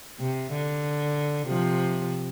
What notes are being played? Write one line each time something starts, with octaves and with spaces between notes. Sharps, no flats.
C3
D3
C3 F3